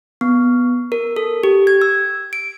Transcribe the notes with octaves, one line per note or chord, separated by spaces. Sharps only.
B3
A#4
A4
G4
G#6
E6
D7